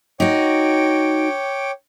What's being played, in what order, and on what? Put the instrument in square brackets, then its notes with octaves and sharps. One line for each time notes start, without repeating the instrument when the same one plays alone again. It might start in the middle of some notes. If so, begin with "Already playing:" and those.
[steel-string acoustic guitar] D#4 F#4 [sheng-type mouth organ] C#5 G5 D6